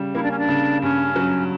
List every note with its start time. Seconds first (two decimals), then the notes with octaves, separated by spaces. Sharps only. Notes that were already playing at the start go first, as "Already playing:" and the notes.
Already playing: C#3 G3
0.14 A#3 E4
0.22 D4
0.30 C#4
0.38 D4
0.49 C#3
0.82 G2 C#4
1.16 F#3